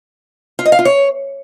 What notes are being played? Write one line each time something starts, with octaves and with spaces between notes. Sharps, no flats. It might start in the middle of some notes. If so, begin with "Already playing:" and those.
F4
D#5
F5
F4
C#5